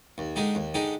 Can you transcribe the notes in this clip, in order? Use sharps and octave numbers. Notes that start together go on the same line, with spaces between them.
D#2
D3 G#3 D#4 G4
D#2
D3 G#3 D#4 G4